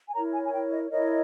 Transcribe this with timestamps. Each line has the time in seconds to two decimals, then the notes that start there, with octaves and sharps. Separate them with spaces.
0.09 G#5
0.14 E4 A#4 C#5 A#5
0.33 G#5
0.44 G#5
0.52 G5
0.71 D#5
0.90 E4 A#4 C#5 D#5